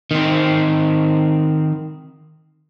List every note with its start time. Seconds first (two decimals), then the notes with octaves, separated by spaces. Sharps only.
0.11 D#3 C4